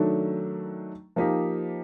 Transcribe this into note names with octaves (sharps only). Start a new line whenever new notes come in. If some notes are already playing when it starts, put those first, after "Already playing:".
Already playing: D#3 F#3 A3 D4
F3 A#3 D#4 G4